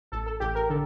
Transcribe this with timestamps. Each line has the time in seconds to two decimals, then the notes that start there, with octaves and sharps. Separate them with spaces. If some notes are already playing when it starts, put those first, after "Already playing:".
0.12 A1 A4
0.26 A4
0.40 A1 G4
0.55 A#4
0.69 D3 A4